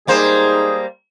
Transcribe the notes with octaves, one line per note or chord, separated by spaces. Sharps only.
G3 G#3 A#3 D#4 G#4 C5